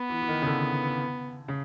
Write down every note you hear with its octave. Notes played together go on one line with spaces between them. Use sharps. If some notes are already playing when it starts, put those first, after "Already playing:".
Already playing: B3
E3
E3
D#3
C#3
D3
C#3